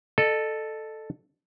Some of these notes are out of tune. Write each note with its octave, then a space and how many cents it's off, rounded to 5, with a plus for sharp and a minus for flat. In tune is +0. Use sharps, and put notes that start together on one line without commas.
A4 +0 D#5 -40